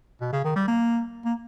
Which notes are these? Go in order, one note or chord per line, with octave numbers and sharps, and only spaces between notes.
B2
C#3
D#3
G3
A#3
A#3